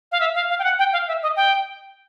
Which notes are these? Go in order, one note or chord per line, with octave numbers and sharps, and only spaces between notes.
F5
E5
F5
F5
G5
F#5
G5
F5
E5
D#5
G5